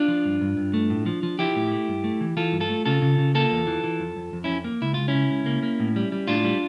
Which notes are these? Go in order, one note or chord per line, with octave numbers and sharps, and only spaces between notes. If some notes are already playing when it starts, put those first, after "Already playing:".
Already playing: D4 F4
F3
G2
G2
G2
A3
A2
F3
F3
F3 E4 G4
A2
A3
G2
A3
E3
E3 F4 A4
G2
F4 A4
A3
C#3 F4 A4
C#3
C#3
A#3 F4 A4
E2
E3
E3
F2
F2
F2
F2 C#4 E4
A#3
C#2 E4
C#2 F4
C#4 E4
C#3
C#2
A#3
A#3
A2
G3
G3
A2 D4 F4
G3